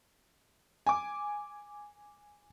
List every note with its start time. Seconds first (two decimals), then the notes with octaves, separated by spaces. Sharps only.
0.87 G#5 D6